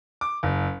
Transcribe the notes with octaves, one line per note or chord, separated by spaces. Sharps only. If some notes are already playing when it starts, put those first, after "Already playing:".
D6
F#1